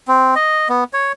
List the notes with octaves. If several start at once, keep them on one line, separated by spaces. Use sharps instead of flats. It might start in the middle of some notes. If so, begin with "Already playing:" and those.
C4
D#5
B3
C#5